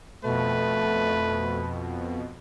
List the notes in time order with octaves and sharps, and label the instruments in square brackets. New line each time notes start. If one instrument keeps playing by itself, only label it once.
[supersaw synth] F2 B2 [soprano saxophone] A3 [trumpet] B4